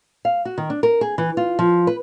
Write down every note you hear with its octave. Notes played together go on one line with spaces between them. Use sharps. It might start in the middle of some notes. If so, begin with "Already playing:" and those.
F5
F#4
D#3
D4
A#4
G#4
E3
F4
F3
B4